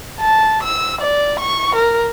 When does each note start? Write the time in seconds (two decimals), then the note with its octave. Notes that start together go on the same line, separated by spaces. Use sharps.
0.20 A5
0.63 E6
1.01 D5
1.40 C#6
1.75 A#4